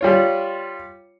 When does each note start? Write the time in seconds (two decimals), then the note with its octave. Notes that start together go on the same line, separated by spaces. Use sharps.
0.01 G3 F4 C#5